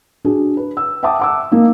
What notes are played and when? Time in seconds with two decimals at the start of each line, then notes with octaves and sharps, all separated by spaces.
0.25 D4 F#4 G#4
0.57 B4
0.77 E6
1.03 E5 F#5 G5 A5 D6 D#6
1.20 F#5 D6 E6
1.51 A#3 D#4